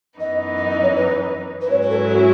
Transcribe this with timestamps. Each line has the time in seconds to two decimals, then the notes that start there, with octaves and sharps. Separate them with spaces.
0.19 F#2 E3 B3 D#4 D#5
0.57 D#5
0.70 D#5
0.82 C#5
0.96 B4
1.61 B4
1.70 G#2 F#3 C#4 E4 C#5
1.82 B4
1.90 A4
2.08 F#4